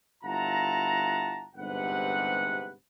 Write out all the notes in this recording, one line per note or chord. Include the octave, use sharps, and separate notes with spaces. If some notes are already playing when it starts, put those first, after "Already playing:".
G1 E4 F4 F#5 A5 A#5
G1 G#2 C3 B4 F#5